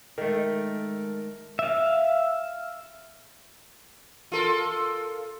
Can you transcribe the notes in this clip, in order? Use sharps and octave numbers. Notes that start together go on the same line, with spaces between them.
D#3 G#3 A3 A4 A#4
E5 F5
F4 A4 A#4